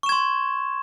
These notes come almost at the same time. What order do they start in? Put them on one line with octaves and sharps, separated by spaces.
C#6 E7 G#6 C6